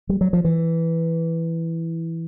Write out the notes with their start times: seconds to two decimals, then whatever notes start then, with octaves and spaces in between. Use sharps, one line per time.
0.09 G3
0.21 F#3
0.33 F3
0.45 E3